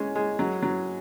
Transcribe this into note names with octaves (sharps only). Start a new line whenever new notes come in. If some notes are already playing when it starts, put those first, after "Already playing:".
Already playing: G#3 C#4
G#3
F#3
F#3